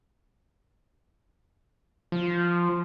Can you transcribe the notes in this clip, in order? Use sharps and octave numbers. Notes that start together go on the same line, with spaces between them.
F3